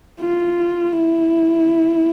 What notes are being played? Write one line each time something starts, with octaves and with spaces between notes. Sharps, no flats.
F4
E4